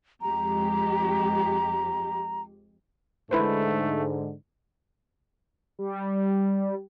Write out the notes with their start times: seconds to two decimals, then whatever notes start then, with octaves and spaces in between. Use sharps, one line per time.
0.22 F2 G#3 G4 A#5
3.31 G#2 D3 A3 E4 B4 C5
5.79 G3